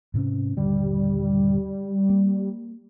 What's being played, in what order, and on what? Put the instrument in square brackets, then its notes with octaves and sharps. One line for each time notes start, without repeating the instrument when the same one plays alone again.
[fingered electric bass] G#2 C3 C#4
[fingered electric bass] D#1 G2 D3 [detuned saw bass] G3
[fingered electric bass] A#3